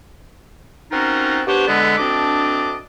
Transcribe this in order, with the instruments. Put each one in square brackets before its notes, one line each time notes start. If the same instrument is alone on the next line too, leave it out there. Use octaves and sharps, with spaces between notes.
[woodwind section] C4 C#4 D#4 F4 F#4 A#4
B3 D4 G4 C5 C#5
D3 G#3 B3
D2 C4 D4 D#5 A5 D6